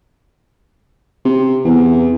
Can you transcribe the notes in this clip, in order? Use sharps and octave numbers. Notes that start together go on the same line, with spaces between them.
C3
E2